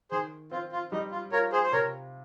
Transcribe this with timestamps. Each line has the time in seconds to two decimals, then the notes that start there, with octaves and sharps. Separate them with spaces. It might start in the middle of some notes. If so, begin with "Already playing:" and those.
0.11 D#3 G#4 C5
0.51 C4 F4
0.72 F4
0.92 G3 D#4
1.11 F4
1.32 F4 A#4 C#5
1.52 G#4 C5
1.63 C5
1.72 C3 A#4 C#5